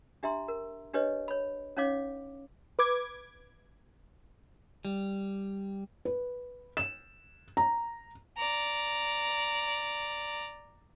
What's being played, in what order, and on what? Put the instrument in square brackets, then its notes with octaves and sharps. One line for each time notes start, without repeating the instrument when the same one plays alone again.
[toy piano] D4 G4 E5 A#5 C6
A#4
D4 G4 B4 C#5 D#5
C#5 B5
C#4 D#4 C#5 F5 D6
[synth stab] B4 D6 G#6
[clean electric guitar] G3
[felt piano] B4
E7
A#5
[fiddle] D5 A#5